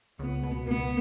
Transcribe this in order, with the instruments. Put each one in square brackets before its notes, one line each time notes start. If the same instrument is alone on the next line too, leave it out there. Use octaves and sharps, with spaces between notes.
[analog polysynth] C#2 [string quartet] B3
[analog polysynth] B2
[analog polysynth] C#2 [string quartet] B3